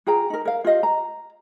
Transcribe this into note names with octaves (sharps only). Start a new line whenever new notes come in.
F4 G#4 G5 A#5
D#4 A#4
A#4 F5
F4 G4 D#5 F5
A#5